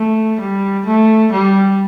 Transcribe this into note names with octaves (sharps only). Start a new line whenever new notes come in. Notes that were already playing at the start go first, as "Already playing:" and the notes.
Already playing: A3
G3
A3
G3